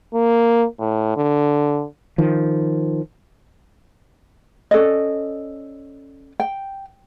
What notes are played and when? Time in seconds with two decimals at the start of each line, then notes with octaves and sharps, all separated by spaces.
0.14 A#3
0.80 A2
1.17 D3
2.18 D#3 F3
4.71 C#4 A4 D5 D#5
6.40 G5